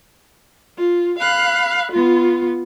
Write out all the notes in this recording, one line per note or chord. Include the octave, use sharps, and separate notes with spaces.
F4
F5 B5 F#6
B3 F4